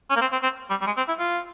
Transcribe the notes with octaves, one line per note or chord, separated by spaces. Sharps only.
C#4
A#3
C4
C4
C4
G3
G3
G#3
C4
E4
F4